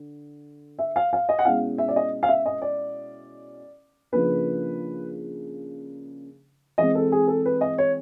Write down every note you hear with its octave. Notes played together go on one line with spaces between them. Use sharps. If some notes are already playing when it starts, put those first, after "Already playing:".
Already playing: D3
E5
F5
F5
D#5
F#5
B2 G#3 C#4 E4 F5
E5
D5
D#5
F5
E5
D#5
D5
C#3 F3 A#3 D4 B4
E3 G#3 C4 D#5
A4
G#4
A4
B4
D#5
C#5